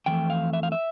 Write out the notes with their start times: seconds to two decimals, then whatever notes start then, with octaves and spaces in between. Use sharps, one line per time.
0.06 F2 E3 A3 G5
0.30 F5
0.53 E5
0.63 F5
0.72 E5